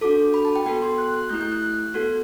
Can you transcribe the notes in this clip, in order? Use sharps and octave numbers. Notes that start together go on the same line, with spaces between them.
D4 F#4 A4 D6
B5
A5
G5
B3 F#4 A4 G5
C6
F#6
F#6
A3 E4 G4 G6
G6
F#6
F#6
B3 F#4 A4